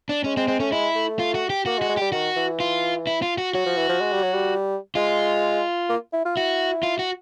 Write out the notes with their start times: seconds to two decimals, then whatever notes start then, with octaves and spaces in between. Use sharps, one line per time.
0.09 D4
0.24 G#3 C#4
0.37 G#3 C4
0.48 G#3 C4
0.60 A3 C#4
0.71 G#3 E4
0.95 A3
1.19 F4
1.35 F#4
1.50 G4
1.66 A#3 F#4
1.78 G#3
1.82 F#4
1.89 G#3
1.97 G3 G4
2.12 D#3 F#4
2.37 E3
2.60 F4
3.07 E4
3.22 F4
3.38 F#4
3.54 F#3 F#4
3.66 F3
3.77 E3
3.89 F3
4.01 G#3
4.12 G3
4.23 F#3
4.33 G3
4.95 G#3 F4
5.89 A#3
6.13 E4
6.25 F4
6.36 E4 F#4
6.83 F4
6.99 F#4